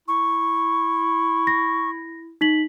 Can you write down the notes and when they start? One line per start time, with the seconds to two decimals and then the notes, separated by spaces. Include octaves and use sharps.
0.08 E4 C#6
1.47 A#6
2.41 D#4 B6 F#7